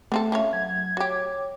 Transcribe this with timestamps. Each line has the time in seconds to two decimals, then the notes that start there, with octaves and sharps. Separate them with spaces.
0.12 A3 B3 C4 A4
0.32 F3 C#4 C#5 E5
0.53 F#3 G#6
0.97 F#4 G4 C#5 D6